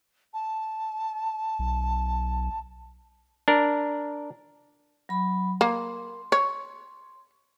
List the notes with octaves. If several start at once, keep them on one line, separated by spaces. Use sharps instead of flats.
A5
B1
D4 A#4
F#3 B5
A#3 C6
C#5